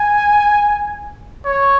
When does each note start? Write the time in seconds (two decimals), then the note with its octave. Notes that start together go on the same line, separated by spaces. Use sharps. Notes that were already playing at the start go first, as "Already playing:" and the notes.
Already playing: G#5
1.45 C#5